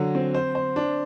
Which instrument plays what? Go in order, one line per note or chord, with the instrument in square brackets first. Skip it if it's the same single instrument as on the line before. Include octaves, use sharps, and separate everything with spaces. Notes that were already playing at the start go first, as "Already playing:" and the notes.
Already playing: [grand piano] D3 F#3
C4
C5
C5
D4